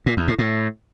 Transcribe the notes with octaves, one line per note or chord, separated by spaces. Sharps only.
A#2
E2
A2
A2